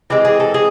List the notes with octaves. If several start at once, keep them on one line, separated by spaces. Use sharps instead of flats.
E3 G#3 C4 G4
G#4
A4
G#4